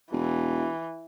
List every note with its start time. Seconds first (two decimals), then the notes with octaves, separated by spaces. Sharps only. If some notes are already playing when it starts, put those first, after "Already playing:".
0.12 E1 E3